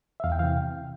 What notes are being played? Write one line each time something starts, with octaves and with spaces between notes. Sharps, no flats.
E5
E2 F5
G5
C3 E3 F5